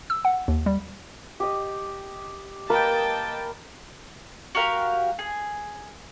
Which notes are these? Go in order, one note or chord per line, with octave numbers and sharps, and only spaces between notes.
E6
F#5
D#2
G3
G4 D#5
A#3 A#4 B4 D#5 G5 A5
F#4 G4 A#4 F5
G#4